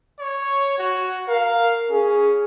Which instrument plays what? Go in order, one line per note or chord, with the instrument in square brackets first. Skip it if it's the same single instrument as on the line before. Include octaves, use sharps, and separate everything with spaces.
[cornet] C#5
F#4
[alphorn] A#4 [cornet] F5
[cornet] C#4 [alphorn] G#4